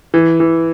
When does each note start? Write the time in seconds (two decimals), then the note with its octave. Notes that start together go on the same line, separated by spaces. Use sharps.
0.14 E3
0.40 E3